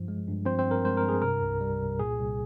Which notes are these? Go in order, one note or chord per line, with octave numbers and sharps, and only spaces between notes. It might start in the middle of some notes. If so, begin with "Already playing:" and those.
Already playing: G2 F3
G#3
G2
F3 C4 C5
C4 C5
G2
A#4
G#3 C5
A#4
G2
G#4
C3 A#4
C2
G3
C2
A#2 G#4
C2